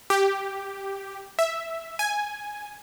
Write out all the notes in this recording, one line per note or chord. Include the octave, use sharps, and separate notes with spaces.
G4
E5
G#5